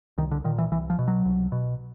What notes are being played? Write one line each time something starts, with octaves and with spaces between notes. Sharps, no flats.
C2 D#3
D3
A#2 D#3
E3
C2 E3
F3
B2
F#3
C2
B2